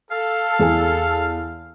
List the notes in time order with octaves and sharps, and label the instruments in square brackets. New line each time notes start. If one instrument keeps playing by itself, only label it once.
[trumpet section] A4 [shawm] F5
[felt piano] E2 G#4 G#5